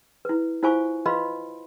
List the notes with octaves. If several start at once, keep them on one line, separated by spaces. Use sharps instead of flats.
E4 B4
E4 F4 C5 F5 G#5 C#6
F4 B4 D#5 F5 B5 C6